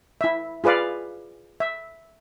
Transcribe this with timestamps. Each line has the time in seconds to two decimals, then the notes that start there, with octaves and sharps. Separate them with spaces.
0.21 E4 E5
0.64 F4 G#4 B4 D5 F5
1.60 E5